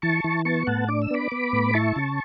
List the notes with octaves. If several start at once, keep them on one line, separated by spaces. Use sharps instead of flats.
E3 A5 C#6
E3
B3 A5 C#6
A2 F#5 A5
D4 D6
E6
B3 B5 D6
B3
A2
E4 A5 C#6
C#3